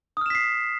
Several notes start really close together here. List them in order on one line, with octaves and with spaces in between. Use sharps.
D#6 F6 E7 B6 C7